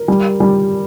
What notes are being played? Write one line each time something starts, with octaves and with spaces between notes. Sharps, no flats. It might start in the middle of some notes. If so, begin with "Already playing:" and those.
Already playing: A#4
G3
G3